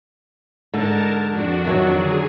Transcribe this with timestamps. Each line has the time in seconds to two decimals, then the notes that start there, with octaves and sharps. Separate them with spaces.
0.73 G#2 D3 A#4 A5
1.30 F2 D4 F#4
1.65 D#3 E3 F#3
1.97 D3 G#4